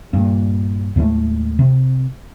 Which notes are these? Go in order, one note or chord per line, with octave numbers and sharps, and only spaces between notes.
G2 A#2
D#2 A2 G#3 A3
C3